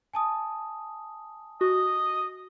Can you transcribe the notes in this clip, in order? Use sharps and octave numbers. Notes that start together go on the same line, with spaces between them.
G#5 A5 D#6
F#4 D#5